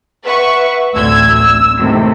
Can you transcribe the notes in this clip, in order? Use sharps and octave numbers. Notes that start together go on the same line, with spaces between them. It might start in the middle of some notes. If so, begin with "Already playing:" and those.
B4 E5 F#5 C#6
A1 D2 E6 G#6
E6
D#2 A2 C3